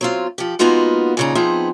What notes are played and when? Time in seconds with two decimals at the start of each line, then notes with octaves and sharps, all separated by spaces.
0.01 F#3 C4 F4
0.38 F3 G4
0.59 G#3 A#3 B3 D#4 F4 F#4
1.17 A#2 C#3 D#4
1.35 F3 B3 C4 D#4 G#4